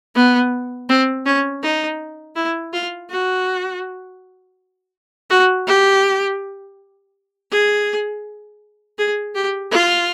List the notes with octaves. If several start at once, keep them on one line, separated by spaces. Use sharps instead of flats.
B3
C4
C#4
D#4
E4
F4
F#4
F#4
G4
G#4
G#4
G4
F4